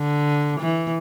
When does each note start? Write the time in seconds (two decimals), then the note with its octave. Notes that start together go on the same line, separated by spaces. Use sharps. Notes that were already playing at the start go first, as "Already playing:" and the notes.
Already playing: D3
0.59 E3